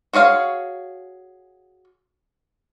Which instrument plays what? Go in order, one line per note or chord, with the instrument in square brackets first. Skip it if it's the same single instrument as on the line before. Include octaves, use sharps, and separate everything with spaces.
[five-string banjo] F#4 G#4 C#5 F5